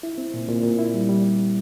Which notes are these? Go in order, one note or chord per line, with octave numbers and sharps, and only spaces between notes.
E4
C4
A#2
A#2
A#2
E4
G3
G3